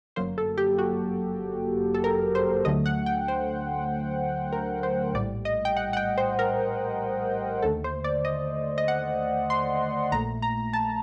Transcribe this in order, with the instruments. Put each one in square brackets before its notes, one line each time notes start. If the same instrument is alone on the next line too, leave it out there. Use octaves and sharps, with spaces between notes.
[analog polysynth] G1 F#2 F#3 A#3 C5
A4
G4
F#4
A4
A#4
C5
D2 D3 F#3 A3 D#5
F#5
G5
C5
A#4
C5
A#1 A2 G3 D5
D#5
G5
F#5
F#5
G5
C5
A#4
D#2 D3 A3 A4
C5
D5
D#5
D#5
F#5
C6
A#1 A#2 A3 A#5
A#5
A5